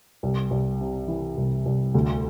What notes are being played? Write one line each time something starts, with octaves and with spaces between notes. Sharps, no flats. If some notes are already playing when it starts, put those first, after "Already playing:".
C2
C2
C3
E3
C2
C2
D2